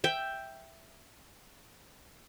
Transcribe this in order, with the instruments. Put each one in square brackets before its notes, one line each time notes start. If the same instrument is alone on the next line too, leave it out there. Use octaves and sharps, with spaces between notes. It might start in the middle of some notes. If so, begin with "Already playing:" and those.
[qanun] E5 G5